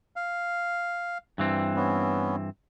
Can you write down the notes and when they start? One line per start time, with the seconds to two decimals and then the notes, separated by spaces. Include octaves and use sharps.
0.16 F5
1.38 G2 E3 C4
1.76 B3 C#4